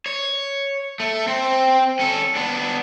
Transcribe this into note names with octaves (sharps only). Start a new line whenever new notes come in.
C#5
A3
C4
C#4 A4
B3 D4